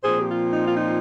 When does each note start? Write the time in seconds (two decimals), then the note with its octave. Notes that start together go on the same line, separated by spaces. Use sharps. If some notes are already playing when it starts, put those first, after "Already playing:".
0.03 A#2 F3 C4 G#4 C5
0.20 G4
0.29 F4
0.53 D#4
0.67 F4
0.76 D#4